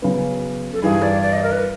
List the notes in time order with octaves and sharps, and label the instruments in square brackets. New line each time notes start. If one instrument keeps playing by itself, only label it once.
[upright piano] C#3 F#3 B3
[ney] A4
[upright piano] G2 E3 G3 [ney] G#4
[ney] D5
D5
D#5
A#4
B4